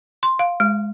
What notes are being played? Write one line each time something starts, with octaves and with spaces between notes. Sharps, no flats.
C6
F5
G#3